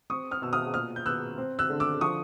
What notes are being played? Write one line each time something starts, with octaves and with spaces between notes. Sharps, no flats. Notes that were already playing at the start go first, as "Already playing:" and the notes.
C4 C#6 D#6
D#6 F6
B2 E6
D#6 F6
A#2 D#6 F6
G6
B3 E6 F#6
C4
E6 F#6
D3
D6 E6
F3 C#6 D#6